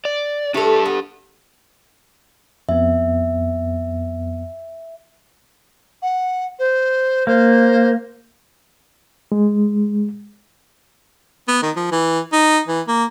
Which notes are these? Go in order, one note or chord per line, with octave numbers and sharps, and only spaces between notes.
D5
A3 D4 G4 A4
B3
F2 B3 E5
F#5
C5
A#3 C5
G#3
B3
D#3
F3
E3
D#4
E3
A#3